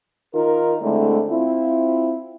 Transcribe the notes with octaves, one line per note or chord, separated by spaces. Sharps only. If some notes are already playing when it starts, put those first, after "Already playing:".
D#3 D#4 F4 A#4
D3 G#3 A3 C4 E4 D5
C4 E4 F4